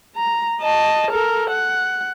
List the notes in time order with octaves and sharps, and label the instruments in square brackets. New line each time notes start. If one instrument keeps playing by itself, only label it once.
[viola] A#5
D#5 A5
A4 A#4
F#5